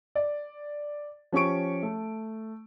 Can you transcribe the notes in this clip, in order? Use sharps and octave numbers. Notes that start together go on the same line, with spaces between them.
D5
F3 C#4 G4 C#6 D7
A3